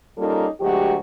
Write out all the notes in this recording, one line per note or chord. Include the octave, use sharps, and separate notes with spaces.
G3 A#3 C#4 D#4 F4 A4
D2 F#3 G#3 F#4 G4